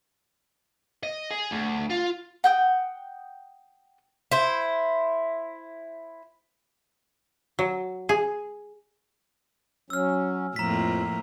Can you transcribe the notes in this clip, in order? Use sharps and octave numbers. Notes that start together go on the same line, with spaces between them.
D#5
G#4
D2
F4
F#5 G5 D#6
E4 C5
F#3
G#4
F#3 C#4 E6 F6
F2 A2 F3 A#3 A#5 B6